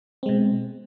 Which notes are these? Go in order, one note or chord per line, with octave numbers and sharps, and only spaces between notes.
B2 G#3 C4